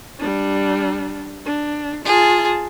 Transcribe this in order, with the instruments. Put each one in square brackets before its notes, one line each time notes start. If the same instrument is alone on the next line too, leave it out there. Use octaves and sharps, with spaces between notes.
[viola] G3 D4
D4
[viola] F4 A5 [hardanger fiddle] G#4